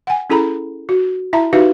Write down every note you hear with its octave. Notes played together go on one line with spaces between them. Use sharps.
F#5 G#5
C#4 E4 G#4 A4 A#5 B5
F#4
E4 E5 A5 A#5
D#4 F#4 G4 B4 E5 F5